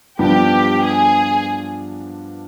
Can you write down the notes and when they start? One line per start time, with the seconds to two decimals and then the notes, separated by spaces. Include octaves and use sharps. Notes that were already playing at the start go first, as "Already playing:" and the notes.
0.19 G2 F3 B3 D4 G4
0.81 G#4